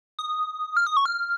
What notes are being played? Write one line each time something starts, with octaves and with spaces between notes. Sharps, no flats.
D#6
F6
D#6
C#6
F6